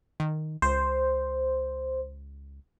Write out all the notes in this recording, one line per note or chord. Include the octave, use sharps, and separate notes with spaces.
D#3
C#2 C5